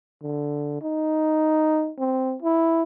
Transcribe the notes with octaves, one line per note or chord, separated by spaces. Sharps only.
D3
D#4
C4
E4